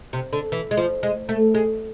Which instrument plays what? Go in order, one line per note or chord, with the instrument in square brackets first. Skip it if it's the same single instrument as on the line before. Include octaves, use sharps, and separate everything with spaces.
[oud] C3
D3
E3
G#3
F3
G#3
A3
G#3